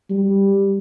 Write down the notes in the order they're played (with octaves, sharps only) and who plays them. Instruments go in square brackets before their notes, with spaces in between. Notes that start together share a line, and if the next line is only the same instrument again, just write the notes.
[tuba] G3